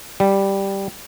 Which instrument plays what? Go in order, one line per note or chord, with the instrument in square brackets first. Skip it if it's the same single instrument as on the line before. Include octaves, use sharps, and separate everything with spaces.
[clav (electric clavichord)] G3